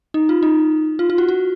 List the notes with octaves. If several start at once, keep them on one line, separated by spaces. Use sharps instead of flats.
D#4
F4
D#4
F4
F4
F#4
F#4